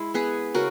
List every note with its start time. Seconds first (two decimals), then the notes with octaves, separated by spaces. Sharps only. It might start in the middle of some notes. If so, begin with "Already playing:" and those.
Already playing: G#3 E4
0.14 B3 G#4 B4
0.54 C#3 F#4 A#4